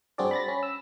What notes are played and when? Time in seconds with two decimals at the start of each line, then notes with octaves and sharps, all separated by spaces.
0.18 G2 C4 D4 F#4 G#4 D5
0.31 B5 A6 A#6
0.48 C#4 B5
0.63 E6